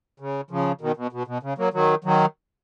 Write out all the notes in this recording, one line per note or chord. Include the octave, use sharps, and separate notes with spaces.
C#3
C#3 F3
B2 D#3
B2
B2
B2
C#3
F#3 A#3
D#3 F#3
D#3 F#3